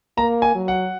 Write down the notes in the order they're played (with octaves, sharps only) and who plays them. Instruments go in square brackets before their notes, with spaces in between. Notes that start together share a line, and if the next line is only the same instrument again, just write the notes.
[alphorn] A#3 [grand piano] A#5
[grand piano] G#5
[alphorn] F#3
[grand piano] F#5